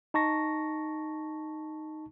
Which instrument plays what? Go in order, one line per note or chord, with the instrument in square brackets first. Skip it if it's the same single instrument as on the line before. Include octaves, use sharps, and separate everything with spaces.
[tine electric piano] D#4 A5 C#6 A#6